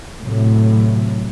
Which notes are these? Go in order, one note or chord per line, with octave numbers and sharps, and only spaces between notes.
A2 C3 F#3